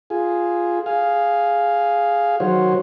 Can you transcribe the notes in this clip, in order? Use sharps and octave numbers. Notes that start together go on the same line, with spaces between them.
F4 G#4
G#4 F5
D#3 F#3 F#4 C5 C#5